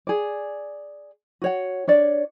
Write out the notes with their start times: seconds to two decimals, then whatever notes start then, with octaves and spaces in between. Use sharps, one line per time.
0.07 G#4 D5
1.42 F#4 C#5 F#5
1.88 D4 C#5 D5